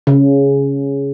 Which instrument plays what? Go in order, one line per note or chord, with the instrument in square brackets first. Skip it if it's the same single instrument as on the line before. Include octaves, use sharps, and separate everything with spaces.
[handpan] C#3